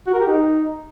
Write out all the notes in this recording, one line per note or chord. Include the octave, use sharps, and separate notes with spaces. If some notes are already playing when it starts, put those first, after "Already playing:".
F#4
A#4
G4
D#4